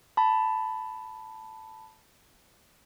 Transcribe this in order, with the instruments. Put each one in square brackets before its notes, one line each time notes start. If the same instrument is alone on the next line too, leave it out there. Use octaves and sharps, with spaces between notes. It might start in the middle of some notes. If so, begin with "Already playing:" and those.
[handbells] A5 B5